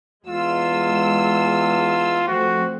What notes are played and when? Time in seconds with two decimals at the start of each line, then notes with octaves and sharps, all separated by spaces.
0.26 E2 G#3 F4 E6
2.27 F3 A3 C4 F#4